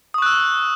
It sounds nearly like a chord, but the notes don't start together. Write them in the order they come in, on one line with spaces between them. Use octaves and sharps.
D#6 C#6 F#6 E6